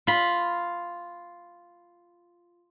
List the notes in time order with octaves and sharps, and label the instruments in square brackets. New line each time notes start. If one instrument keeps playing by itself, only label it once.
[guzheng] F4 B5